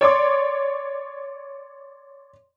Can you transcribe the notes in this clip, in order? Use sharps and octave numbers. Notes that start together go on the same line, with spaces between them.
C#5 D5 C6 D6